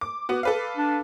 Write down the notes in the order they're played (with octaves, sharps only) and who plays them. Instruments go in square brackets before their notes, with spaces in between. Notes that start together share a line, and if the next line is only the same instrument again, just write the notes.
[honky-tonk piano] D6
B3 F#4
A4 B4 F5
[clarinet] D4